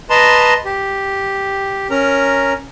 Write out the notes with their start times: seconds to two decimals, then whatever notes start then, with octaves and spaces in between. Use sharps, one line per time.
0.10 B4 D#5 A5 A#5 C6
0.65 G4
1.90 C#4 A#4 A#5